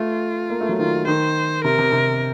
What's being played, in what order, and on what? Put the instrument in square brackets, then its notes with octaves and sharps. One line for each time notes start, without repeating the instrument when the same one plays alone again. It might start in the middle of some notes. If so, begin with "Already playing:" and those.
Already playing: [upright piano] A3 [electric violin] F4
[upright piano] A#3
A3
F#3
[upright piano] D#3 [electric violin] F4
[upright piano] D#3 [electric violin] C5
[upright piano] C3 [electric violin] A#4
[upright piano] C3
C3